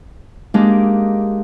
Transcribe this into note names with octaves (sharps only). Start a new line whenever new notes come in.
G#3 A#3 D4 D#4 G4